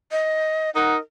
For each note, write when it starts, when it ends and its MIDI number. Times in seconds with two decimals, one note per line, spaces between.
0.12 0.70 75
0.75 0.96 63
0.75 0.98 70
0.75 0.96 75
0.75 0.96 78